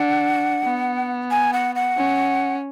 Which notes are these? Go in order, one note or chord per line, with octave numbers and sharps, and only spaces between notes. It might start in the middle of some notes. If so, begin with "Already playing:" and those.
Already playing: D4 F#5
B3
G#5
F#5
F#5
C#4